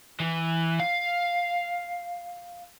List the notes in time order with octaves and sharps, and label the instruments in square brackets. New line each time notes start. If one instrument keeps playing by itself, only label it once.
[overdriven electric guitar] E3
F5